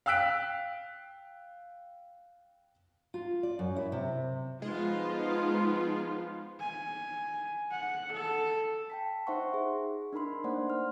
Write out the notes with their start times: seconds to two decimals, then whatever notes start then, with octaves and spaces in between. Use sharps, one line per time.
0.06 F5 G5 E6 F#6 B6 D7
3.14 F4
3.43 D5
3.59 F#2
3.76 E4
3.92 C3
4.62 F3 G#3 B3 D#4 F4
6.60 G#5
7.71 F#5
8.12 A4
8.90 G5 A5 B6
9.27 D#4 C5 E5 F#5 C6 C#6
9.54 G#4
10.13 D4 D#4 A#4 B5 C6
10.44 A3 A#3 C5 D5 F#5 C6
10.70 F6